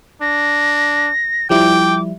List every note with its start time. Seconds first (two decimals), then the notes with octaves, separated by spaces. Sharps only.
0.22 D4 A#6
1.50 F3 G3 E4 G5 D6